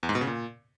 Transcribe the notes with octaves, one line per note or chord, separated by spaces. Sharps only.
E2
G#2
B2
C#3
A#2